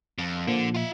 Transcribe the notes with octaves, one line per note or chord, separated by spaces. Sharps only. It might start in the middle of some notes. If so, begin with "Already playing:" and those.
F2
A#2 D3 F3
F4 E5